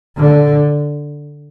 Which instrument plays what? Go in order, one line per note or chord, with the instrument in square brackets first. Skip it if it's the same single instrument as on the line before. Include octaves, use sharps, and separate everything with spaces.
[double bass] D3